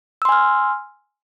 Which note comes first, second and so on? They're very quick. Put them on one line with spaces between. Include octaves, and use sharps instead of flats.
E6 C6 G#5 F6